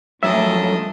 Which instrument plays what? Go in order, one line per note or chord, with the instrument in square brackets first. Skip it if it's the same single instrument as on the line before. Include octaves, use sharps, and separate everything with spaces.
[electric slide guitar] F#2 G3 C#5 [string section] F3 A3 [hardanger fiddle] D4 D#5 [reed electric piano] E5